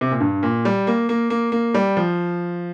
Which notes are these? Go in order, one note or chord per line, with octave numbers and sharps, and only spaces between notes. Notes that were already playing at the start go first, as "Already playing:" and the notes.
C3
A#2
G2
A#2
G3
A#3
A#3
A#3
A#3
G3
F3